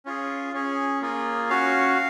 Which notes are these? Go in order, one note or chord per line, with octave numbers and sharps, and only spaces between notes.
C#4 F4 G#4
C#4 G#4
A#3 F4 G#4
C#4 F#4 F5